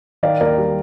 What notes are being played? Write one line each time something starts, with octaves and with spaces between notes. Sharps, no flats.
D#3 D5 F5
D#2 A#4 D5
G3